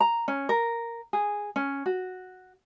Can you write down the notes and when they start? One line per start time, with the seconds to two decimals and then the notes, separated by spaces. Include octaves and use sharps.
0.01 A#5
0.28 C#4
0.49 A#4
1.13 G#4
1.56 C#4
1.86 F#4